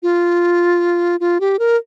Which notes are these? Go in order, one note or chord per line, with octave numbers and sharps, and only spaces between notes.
F4
F4
G4
A#4